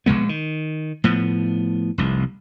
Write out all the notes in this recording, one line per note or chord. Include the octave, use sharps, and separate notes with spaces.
A#1 F2 G#3 B3
D#3
A2 F3 B3
F1 C2